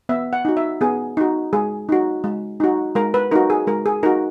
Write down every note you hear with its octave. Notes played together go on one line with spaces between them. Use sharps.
B3 E5
F#5
D#4 F#4
E5
B3 G#4
D#4 F#4
G#3 G#4
D#4 F#4
G#3
D#4 F#4
G#3 A#4
B4
D#4 F#4 A#4
G#4
G#3 A#4
G#4
D#4 F#4 A#4